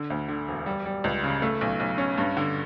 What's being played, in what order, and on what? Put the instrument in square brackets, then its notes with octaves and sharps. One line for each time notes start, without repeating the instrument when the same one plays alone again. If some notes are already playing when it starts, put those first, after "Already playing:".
Already playing: [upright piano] D3
D2
D3
E1
G3
G3
C#2
C#3
A3
B1
B1
C#4
G2
D3